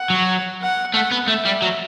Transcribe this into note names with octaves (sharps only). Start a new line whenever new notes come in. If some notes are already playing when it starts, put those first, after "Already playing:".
Already playing: F#5
F#3
F#5
A3 F#5
B3
A3 E5
G3
F#3